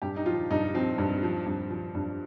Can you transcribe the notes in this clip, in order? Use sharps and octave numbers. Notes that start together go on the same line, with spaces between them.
G2 G4
D#4
F3 F4
G2 D#4
F3 C4
G2
F3
G2
F3
G2